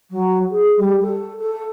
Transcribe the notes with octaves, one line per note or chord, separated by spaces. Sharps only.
F#3
G#4
G3
A4
A4